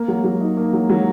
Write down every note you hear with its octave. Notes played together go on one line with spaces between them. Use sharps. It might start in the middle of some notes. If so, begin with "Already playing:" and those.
Already playing: A#3
F#3
F#3
D#4
A#3
F#3
F#3